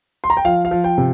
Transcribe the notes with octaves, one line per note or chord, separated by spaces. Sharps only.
C6
A#5
G5
F3 F5
F5
F3
G5
C3